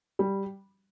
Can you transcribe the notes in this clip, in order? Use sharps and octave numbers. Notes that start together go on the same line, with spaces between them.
G3